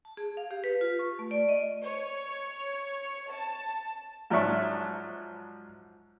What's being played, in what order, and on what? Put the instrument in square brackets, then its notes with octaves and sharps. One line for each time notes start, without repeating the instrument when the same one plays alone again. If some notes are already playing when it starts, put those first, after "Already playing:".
[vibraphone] A5
G#4
F5
G4
B4
F4
C#6
A3
D5
D#5
[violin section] C#5
A5
[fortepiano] G#2 F3 F#3 D5 E5 C#6